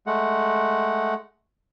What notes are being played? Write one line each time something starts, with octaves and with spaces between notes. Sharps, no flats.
G#3 A3 F#5